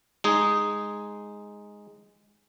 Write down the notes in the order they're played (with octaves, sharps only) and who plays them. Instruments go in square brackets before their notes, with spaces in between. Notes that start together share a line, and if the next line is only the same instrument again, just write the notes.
[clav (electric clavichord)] G#3 D#4 G#4